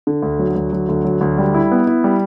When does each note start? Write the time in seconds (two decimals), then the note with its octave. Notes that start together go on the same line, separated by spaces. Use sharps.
0.07 D3
0.23 D2
0.39 F#3
0.56 D2
0.73 F#3
0.89 D2
1.05 F#3
1.21 D2
1.38 G3
1.54 E4
1.71 B3
1.87 E4
2.04 G3